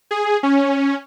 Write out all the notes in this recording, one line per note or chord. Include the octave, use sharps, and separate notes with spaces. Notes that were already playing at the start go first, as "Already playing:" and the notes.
G#4
C#4